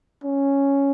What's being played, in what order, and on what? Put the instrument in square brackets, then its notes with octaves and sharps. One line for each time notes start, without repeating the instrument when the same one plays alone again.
[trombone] C#4